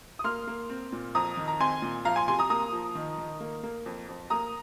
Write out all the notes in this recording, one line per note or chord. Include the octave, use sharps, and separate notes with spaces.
D#6
A#3 C6 F6
A#3
C4
A#2
F2 A#5 D#6
D#3
A#5
C4 G#5 C6
A#2
F3 F5 A#5
G#5 C6
C3 G#5 C6
A#5 D#6
A#3 A#5 D#6
F3
D#3
D#3
A#3
A#3
F2
F2
A#3 A#5 D#6